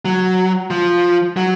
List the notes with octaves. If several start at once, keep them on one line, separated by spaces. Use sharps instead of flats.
F#3
F3
F#3